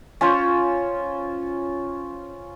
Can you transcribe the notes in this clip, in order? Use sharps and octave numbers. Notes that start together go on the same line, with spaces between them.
C#4 F4 C5 C#5